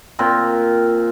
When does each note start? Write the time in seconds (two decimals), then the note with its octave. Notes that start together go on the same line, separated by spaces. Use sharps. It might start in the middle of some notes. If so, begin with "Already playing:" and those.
0.19 A#2 C4 A#4